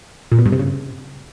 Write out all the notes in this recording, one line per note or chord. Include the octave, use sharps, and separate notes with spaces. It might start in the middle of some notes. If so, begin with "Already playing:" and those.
A#2
B2
G2
C3
C#3